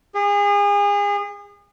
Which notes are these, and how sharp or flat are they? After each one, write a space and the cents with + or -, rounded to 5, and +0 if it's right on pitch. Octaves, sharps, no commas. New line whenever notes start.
G#4 -35